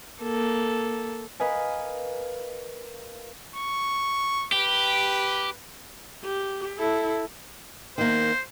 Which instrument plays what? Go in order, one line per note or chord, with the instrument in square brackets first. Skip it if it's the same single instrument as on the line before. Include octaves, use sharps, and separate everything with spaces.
[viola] A#3 A4
[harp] A#4 B4 D#5 F5 G#5
[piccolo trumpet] C#6
[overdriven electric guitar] G4 [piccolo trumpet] B4
[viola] G4
E4 A4
[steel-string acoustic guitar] D#3 A#3 [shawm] C5